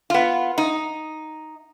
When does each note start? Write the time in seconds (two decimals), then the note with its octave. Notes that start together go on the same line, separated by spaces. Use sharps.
0.10 B3 F4
0.58 D#4